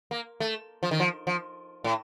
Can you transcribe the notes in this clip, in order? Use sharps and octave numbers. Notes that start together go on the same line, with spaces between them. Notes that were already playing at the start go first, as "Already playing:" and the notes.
A#3
A3
F3
D#3
F3
F3
A2